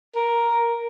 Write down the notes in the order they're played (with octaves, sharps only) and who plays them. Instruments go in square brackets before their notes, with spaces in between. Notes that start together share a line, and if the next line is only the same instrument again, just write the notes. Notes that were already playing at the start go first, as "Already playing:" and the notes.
[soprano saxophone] A#4